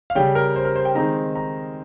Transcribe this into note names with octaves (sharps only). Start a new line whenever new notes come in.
F5
C#3 G3 C#4 G5
A#4
C5
A#4
C5
G5
D#3 G#3 C4 D#4 A#5
A#5